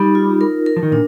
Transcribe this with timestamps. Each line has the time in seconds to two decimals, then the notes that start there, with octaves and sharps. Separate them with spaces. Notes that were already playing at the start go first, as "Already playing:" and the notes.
Already playing: G3 D#4
0.15 F4
0.41 A#4
0.66 A#4
0.76 F3
0.83 D#3
0.92 A#2 D4